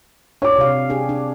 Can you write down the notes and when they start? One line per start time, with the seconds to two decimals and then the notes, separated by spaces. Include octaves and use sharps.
0.42 D4 C#5 D6
0.58 C3 F5
0.90 D4 G4 G#4
1.09 D4